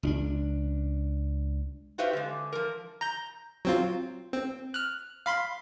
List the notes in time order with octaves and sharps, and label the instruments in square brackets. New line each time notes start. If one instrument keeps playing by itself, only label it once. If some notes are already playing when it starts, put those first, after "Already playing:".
[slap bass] C#2 C#4 D4
[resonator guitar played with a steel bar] F#4 G4 B4 C5 E5 F5
D3 G#3
F3 A#4
[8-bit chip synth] A#5 G6
F#3 C4 F4
C4
F6 F#6
F5 B5 C6